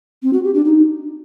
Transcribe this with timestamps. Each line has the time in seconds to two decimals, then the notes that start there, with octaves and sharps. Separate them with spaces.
0.23 C4
0.33 F#4
0.44 G4
0.54 D4
0.65 D#4